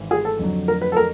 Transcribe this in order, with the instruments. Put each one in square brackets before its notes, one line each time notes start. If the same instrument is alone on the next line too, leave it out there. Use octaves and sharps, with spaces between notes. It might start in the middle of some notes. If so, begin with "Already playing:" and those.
Already playing: [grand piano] G#1 G#2 E3
[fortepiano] G#4
A4
[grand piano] F2 D3 F#3
[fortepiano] A#4
B4
A4
A#4